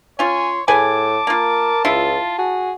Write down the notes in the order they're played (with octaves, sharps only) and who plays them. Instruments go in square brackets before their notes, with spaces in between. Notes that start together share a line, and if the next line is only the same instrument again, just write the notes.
[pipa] C#4 F4 [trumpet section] C#5 C6 [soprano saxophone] G#5
[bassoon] A2 [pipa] G#4 B4 G#5 [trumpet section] A5 [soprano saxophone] D6
[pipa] A#3 F4 [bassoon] A#4
[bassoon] C#2 [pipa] E4 [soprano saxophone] F4
[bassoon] F#4 [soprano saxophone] G#4